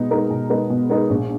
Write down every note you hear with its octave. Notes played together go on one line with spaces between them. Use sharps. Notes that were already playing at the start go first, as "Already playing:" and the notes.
Already playing: B2 G#3 B3 D#4
G#3 B3 D#4 A#4
B2
G#3 B3 D#4 A#4
B2
G#3 B3 D#4 A#4
A#1